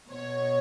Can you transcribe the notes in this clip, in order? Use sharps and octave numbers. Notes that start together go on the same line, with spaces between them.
B2 C#5